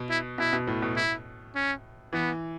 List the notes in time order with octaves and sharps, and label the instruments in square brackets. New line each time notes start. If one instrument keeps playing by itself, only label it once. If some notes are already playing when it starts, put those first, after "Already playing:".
Already playing: [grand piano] B2
[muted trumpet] E4
[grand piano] B2 [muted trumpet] E4
[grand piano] B2
A2
B2
[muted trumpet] E4
C#4
[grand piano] E3 [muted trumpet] B3